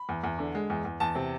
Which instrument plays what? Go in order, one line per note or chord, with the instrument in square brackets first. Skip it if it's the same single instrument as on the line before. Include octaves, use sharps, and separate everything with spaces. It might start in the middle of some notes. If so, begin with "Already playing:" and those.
Already playing: [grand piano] B5
[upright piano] E2
E2
D3
G#3
E2
E2
[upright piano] E2 [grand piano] A5
[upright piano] C3